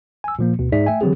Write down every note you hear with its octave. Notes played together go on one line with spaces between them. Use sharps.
G#5 E6
A#2 F3 A#3
D2 B2
G#2 D#4 G#4 D5 E5 B6
A3 E5 G5 G#5
D3 E3 F#3 C4 G4 G#4